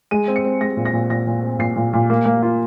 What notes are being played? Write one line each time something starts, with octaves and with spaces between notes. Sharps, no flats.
G#3 D#7
C4
C#7
C4
G#3 A#6
A#2
A#6
A#2
A#2 A#6
A#2
C4
A#2 C7
A#2
A#2
A#3
A#3
F4